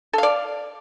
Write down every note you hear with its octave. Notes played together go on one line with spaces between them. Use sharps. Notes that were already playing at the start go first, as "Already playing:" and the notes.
A4 D5 F5